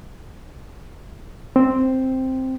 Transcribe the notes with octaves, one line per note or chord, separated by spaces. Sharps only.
C4